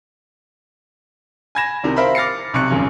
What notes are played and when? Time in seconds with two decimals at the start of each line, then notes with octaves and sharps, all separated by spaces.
1.55 G#5 B5 G#6 A#6 E7
1.83 C2 C3 D#3
1.96 A#4 C5 E5 F5 B5
2.15 D6 F6 A6 A#6 C7 C#7
2.54 B1 C3 C#6 F#6 C#7
2.70 G#1 C#2 F#2 C#3